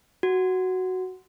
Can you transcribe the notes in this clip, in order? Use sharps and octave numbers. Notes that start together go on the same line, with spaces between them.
F#4